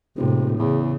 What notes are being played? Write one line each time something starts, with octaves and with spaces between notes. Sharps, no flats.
E1 A2 C3
E2 C#3